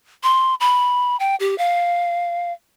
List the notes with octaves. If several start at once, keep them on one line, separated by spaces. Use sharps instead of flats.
C6
B5
G5
G4
F5